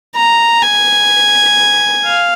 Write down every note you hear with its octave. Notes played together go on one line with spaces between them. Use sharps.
A#5
G#5
F5